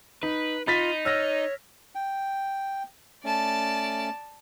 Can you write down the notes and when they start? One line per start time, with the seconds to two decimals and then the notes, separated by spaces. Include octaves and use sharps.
0.23 D#4 B4
0.67 D#4 F4 B5 A6 B6
1.05 C#5 E6 F6 A#6
1.95 G5
3.24 A3 C#4 D5 A5